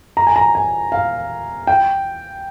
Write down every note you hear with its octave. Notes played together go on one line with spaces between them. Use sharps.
A#5
G#5
A#5
G#5
F5
G5